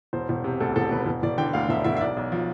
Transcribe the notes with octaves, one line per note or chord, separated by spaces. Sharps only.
E1 C5
E1
C3
D2 A4
E1 A4
E1 B4
E1
E1 D5
D3 G5
D2 F5
E1 E5
E1 E5
E5
B1 D5
B1
F3